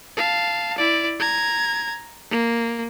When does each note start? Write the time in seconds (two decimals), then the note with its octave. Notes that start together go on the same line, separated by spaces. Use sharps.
0.17 F5 A5
0.78 E4 D5
1.20 A#5 G#6
2.31 A#3